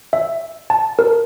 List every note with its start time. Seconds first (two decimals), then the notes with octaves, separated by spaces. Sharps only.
0.13 E5
0.70 A5
0.99 A#4